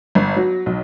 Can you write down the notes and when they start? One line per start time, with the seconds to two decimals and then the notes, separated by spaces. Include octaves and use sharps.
0.15 G1
0.36 F#3
0.66 B1